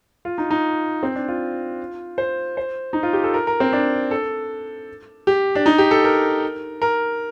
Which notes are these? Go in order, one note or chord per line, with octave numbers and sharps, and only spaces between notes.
F4
D#4
D#4
C4
D4
F4
C5
C5
D#4
F4
G4
A4
A#4
A#4
C4
D4
A4
G4
D4
D#4
G4
A4
A#4
A#4